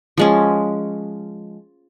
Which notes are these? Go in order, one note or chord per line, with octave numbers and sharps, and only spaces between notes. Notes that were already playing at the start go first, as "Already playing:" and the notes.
F3 G#3 C#4